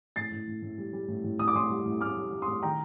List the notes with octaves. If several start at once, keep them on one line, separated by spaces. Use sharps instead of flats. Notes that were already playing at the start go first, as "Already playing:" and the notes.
A2 A6 C7
A2
A2
A2
G3
G3
A2
A2
A2 D#6
D6
A2 C6 D#6
G3
A2
A2 D6 F6
G3
G3
C6 D#6
A2
D#3 G5 A#5